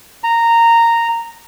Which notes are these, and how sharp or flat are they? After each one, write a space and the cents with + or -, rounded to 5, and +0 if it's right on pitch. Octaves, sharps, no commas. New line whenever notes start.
A#5 -10